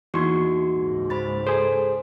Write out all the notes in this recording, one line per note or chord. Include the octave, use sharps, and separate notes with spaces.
E2 A#3 D#4 F#4 C6 C#6
C#2 G#2
C5 B5 A6
G#4 A4 C5